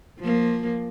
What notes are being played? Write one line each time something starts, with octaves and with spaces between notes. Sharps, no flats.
F3 A#3